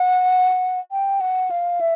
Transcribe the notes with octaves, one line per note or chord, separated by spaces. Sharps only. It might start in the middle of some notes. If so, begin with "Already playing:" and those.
Already playing: F#5
G5
F#5
F5
E5